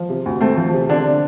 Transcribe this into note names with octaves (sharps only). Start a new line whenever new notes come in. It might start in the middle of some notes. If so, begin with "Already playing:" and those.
Already playing: F3
C3
D2
A3 C4
F3
C3
D3 D4